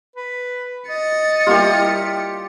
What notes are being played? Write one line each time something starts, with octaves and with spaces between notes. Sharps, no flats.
B4
D#5 A6 C#7
G3 A#3 E4 F4 G4